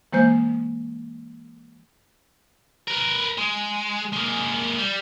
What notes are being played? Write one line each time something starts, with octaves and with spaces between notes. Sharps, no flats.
E3 G#3 A#3 C5 G6
A#4 B4
G#3
G#3 A#3
G3